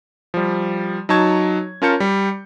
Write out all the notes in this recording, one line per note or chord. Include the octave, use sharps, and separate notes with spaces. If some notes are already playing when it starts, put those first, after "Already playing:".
F3 G3
F#3 D#4 C#5 A5 C#6 G#6
C#4 F4 A#4 A5 G6 C#7
G3